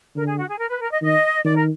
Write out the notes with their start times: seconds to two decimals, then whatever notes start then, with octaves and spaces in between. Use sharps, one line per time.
0.15 D3 A#4
0.26 G#4
0.38 F#4
0.48 G#4
0.58 A#4
0.70 B4
0.81 A#4
0.91 D#5
1.02 D#3 D#5
1.45 D#3 D5
1.56 A#4